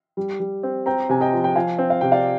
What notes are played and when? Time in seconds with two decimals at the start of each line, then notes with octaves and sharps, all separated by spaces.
0.17 G3
0.40 G3
0.63 C4
0.86 C4 G5 A#5
1.09 C3 G#5
1.21 D#5 G5
1.33 F3
1.44 G5
1.56 F3 F5 G#5
1.79 C4
1.90 F5
2.01 C3 G5
2.12 D5 F5